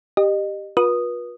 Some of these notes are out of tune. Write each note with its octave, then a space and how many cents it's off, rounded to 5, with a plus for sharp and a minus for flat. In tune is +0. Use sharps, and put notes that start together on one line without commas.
G4 +5 D#5 -25
F4 +40 B4 -35 D#6 -10